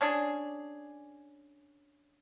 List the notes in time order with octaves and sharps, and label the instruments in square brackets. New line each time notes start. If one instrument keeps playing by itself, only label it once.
[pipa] C#4 D4 G#4